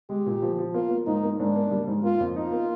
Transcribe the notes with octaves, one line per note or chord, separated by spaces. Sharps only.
G#3 G4
A#2
F3
F3
A#3 F4
A#3
G#2 D#4
A#3
G#2 D4
A#3
G3
G#2
A#3 F4
F2
D#4 F4
A#3